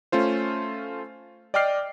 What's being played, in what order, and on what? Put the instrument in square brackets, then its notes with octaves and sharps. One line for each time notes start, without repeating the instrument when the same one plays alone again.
[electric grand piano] A3 C#4 F4 C5
D5 D#5 G5 D6 F6 C7